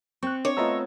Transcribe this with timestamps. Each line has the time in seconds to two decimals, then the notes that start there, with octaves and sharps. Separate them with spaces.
0.23 C4 C#6 F#6
0.45 D4 C#5 D6
0.57 A3 B3 F4 D#5 A#5 E6